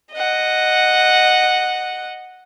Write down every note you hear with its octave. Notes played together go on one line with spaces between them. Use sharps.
D#5 F#5